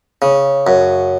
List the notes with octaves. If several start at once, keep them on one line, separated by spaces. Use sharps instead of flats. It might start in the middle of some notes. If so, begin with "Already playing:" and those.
C#3
F#2